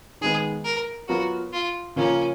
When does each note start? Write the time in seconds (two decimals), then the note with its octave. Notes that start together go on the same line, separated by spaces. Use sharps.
0.21 D#3 G#3 B3 G#4
0.65 A#4
1.08 F#3 B3 F4 F#4 A#4
1.53 F4
1.96 C#3 F3 A#3 C#4 F4 A#4